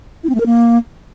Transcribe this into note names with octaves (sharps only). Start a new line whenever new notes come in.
E4
C4
A3
A#4
A#3